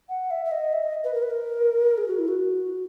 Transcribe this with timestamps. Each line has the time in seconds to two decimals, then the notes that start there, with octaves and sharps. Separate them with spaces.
0.09 F#5
0.31 E5
0.45 E5
0.51 D#5
0.73 E5
0.83 D#5
1.04 B4
1.14 A#4
1.22 B4
1.30 A#4
1.98 G#4
2.08 F#4
2.19 E4
2.28 F#4